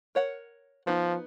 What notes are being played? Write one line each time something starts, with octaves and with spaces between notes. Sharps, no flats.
A#4 C#5 F#5
F3 B3 D#4